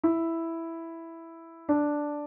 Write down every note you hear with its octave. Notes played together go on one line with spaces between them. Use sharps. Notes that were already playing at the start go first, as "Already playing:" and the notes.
E4
D4